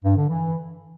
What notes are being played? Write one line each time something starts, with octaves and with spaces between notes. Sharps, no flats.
G2
D3
E3